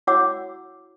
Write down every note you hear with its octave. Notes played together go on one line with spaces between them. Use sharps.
E4 F#4 C#5 F#5 D6 E6